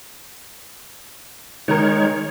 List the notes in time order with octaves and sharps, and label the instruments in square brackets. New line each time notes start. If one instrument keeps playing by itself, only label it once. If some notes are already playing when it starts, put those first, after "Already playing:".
[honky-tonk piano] D#3 A#4 [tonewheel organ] G#3 C#5